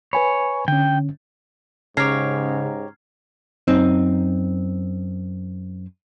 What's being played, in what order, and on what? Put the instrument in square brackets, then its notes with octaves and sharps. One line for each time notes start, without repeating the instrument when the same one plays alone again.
[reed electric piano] B4 G#5 B5 [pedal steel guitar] C#5
[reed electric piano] D3 C#4 [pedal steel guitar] G5
[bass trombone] G#2 [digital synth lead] C#3 [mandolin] G4 C#5 A#5 [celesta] F6 G#6 C7
[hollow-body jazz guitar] F#2 C4 D#4